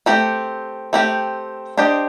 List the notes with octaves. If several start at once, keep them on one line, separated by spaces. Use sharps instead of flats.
A3 C4 G4
A3 C4 G4
D4 G4 C5 D#5